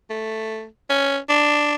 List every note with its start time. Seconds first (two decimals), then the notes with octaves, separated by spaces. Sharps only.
0.10 A3
0.90 C#4
1.29 D4